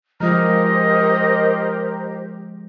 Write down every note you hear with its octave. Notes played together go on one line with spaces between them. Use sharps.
F3 G#3 F4 G4 A#4 C5 D#5